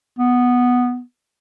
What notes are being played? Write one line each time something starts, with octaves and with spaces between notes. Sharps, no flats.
B3